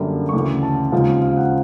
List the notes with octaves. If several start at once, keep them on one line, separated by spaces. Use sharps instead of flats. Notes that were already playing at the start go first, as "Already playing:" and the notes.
Already playing: F#2 D3 G3 A#3
C#6
D2 C#3 E3 D6
A5
D#2 C#3 F3 G#3 C4 F5
F5
F#5